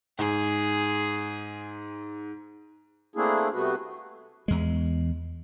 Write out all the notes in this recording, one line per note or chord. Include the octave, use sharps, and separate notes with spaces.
G#2 G#4
A3 A#3 C4 D4 E4 G#4
C3 G3 A3 B3 F#4 B4
E2 G#3